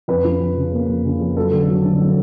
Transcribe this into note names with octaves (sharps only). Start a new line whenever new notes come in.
F2 B4
F3
F2
C#3
A#3
F2
C#3
F2
F#3 A4
D3
F#3
D3
F#3